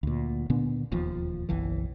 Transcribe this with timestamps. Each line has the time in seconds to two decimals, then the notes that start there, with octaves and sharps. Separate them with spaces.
0.03 D2 A#2
0.50 A#2 D3 B3 D4
0.92 E1 D#2 F3
1.49 F#1 B1 E3